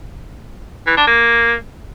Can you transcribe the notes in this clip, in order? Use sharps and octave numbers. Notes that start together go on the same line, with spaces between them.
E3
D4
A#3